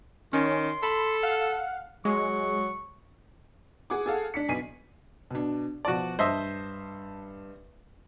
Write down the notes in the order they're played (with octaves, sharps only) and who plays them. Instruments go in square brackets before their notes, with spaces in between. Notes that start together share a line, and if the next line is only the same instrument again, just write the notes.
[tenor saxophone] D#3 [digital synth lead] C#4 [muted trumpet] C6
[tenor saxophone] A4 [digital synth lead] B5
[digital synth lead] F5 [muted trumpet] F#5
[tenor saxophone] F#3 [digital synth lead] G#3 [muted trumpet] C#6
[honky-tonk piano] G#4 F#5 D6
G#4 A4 F5 F#5
D4 B6 C#7
B1 B3 G#5 B6 C7 D#7
[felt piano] B2 D4
[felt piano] B2 F3 A5 [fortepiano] F#4 D5
[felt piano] G2 A5 [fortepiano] C5 D#5 E5